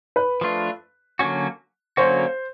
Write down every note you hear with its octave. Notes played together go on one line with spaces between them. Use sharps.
B4
F3 A3 D4 F4
D3 F#3 A#3 C#4 F#4
D3 F#3 A#3 C#4 F#4 C5